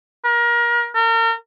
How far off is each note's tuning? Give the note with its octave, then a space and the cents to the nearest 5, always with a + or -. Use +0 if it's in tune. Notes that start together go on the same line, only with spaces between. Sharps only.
A#4 +30
A#4 -35